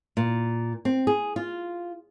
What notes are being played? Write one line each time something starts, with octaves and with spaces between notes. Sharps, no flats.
A#2
C4
G#4
F4